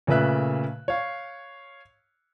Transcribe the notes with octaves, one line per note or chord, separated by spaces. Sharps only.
A#2 C#3 A3 B4 E5 F#6
C#5 F5